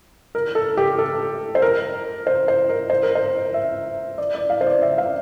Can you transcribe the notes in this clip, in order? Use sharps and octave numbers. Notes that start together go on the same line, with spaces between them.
A#4
A4
G4
A4
C5
A#4
C5
C5
A#4
C5
A#4
C5
E5
D5
D5
F5
C5
D5
E5
F5